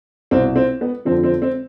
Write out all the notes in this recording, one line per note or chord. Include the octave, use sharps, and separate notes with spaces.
C2 B2 C4
C4
B3
F2 D3 F3 C4
C4
C4